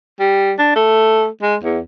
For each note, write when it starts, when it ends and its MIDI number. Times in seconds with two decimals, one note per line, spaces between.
0.20 0.53 55
0.59 0.71 62
0.75 1.26 57
1.42 1.56 56
1.64 1.79 40